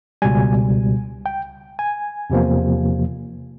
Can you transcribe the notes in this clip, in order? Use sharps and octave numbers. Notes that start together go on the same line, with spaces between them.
C#2 B2 G3 G#5
G5
G#5
E2 C3 F3 A#3